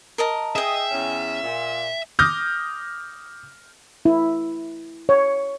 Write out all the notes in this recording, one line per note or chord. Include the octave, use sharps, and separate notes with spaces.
A#4 D#5 A5
G#4 D#5 E5 G5
E2 C#4
A#2
D6 D#6 F6 G6 A#6
E4
C#5